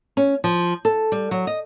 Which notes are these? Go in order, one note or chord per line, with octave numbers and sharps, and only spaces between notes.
C#4
F3
A4
G3
F#3
D#5